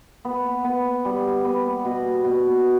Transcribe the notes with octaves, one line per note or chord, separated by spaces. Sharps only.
B3
B3
G3
B3
B2
B2